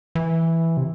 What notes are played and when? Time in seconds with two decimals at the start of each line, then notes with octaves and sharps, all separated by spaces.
0.15 E3
0.77 C3